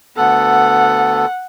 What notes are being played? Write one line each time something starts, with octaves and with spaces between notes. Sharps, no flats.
D2 B3 A4 F#5